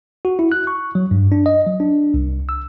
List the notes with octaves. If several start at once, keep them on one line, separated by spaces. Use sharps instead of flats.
F#4
E4
F#6
C#6
F#3
G2
D4
D#5
F#3
D4
C2
E6